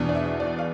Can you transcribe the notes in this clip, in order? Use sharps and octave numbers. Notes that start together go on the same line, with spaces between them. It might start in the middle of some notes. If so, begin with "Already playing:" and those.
Already playing: E2 B2 B3 D4
D5
E5
D5
F5